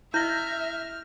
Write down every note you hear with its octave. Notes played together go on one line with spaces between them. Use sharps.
E4 D#5 E5 F6 G6 A#6